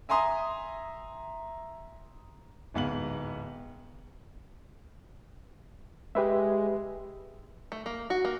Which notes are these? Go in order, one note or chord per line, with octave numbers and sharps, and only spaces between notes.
E5 G#5 A#5 C6 D#6
D1 G#2 B3 F5 F#7
G#3 G4 B4 E5
A3
A#3
F#4
A#3